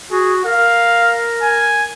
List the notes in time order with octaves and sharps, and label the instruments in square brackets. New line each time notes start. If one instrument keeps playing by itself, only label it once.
[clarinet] F#4 [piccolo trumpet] G#4
[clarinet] A#4 [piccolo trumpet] F5
[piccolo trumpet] G#5